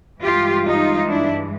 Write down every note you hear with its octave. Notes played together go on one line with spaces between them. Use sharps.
G2 E3 G#3 F4 G4
D#4 F4
D4 E4